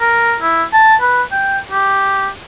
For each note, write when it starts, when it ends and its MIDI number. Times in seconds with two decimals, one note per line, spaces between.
0.01 0.36 70
0.42 0.64 64
0.73 0.96 81
1.01 1.23 71
1.32 1.58 79
1.71 2.29 67